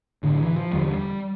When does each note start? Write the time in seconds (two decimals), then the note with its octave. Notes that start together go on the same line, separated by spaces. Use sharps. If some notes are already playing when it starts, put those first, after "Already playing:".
0.23 B1 A2 D3
0.40 E3
0.56 F3
0.72 E1 E2 D3 G3